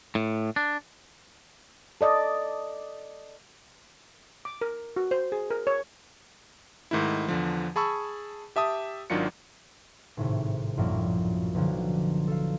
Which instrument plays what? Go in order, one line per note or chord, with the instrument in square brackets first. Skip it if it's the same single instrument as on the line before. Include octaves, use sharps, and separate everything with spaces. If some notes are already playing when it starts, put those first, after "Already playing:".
[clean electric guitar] A2
D4
[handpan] A4 D5 D#5
[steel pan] D6
A#4
F#4
C5
G#4
A#4
C#5
[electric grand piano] G#2 D#3 A3 E4
E2 D3 F3
G#4 A5 B5 C#6 E6
G4 E5 A5 D#6
G#1 D#3 F#3 D4 F4 C#7
[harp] G#1 A2 C3
A#1 F#2 A2 F3 G3 A#3
B1 D3 F3
A4 F5